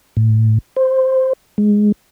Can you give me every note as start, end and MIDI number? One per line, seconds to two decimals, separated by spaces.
0.17 0.58 45
0.76 1.33 72
1.58 1.92 56